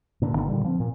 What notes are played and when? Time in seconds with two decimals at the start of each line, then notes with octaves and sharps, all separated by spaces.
0.22 A#2 D3
0.33 G1 D3 D#3 B3
0.48 A#2 D3 G3
0.64 F3 B3 C4
0.80 A#2